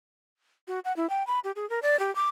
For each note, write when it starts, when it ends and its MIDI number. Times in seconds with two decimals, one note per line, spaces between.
0.68 0.80 66
0.85 0.95 78
0.96 1.09 64
1.10 1.26 79
1.27 1.39 83
1.44 1.52 67
1.56 1.68 68
1.70 1.80 70
1.83 1.99 74
1.99 2.14 67
2.16 2.29 86